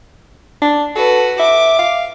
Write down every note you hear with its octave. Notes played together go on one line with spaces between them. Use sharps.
D4
F#4 A4 B4
E5 D6
F5